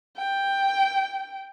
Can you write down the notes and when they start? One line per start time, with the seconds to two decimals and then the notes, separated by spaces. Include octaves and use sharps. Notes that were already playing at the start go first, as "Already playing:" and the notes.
0.17 G5